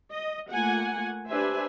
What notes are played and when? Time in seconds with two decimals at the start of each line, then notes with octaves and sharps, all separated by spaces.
0.11 D#5
0.51 A3 A#3 F4 F#5 G#5
1.29 D4 G4 B4 C5 E5 G#5